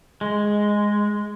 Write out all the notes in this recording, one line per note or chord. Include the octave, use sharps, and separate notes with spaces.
G#3